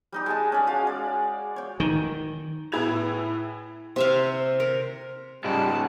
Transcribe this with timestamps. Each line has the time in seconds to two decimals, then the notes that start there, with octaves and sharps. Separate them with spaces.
0.12 G3 D#4 G4
0.26 G#3 G#4 A5
0.52 C#4 D5
0.67 G#3 F#4 F5
0.87 D5
1.56 C#5 G5
1.80 D#3
2.72 A2 B3 E4 G#4 G#6 F7
3.96 C3 E5 F5
4.60 A#4
5.44 G#2 C#3 G3 F#5 A5